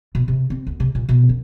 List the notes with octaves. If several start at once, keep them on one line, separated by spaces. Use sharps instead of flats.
B2
C3
C4
D2
C3
A#2
B2
F#2